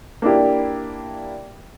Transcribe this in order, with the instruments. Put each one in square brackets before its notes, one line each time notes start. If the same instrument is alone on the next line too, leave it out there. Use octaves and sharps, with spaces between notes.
[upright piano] A#3 D4 E4 G4